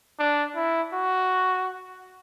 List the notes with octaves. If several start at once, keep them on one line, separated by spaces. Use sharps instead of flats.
D4
E4
F#4